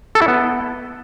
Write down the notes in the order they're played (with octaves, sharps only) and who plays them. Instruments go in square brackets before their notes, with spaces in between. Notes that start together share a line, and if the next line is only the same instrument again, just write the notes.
[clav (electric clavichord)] A4
E4
B3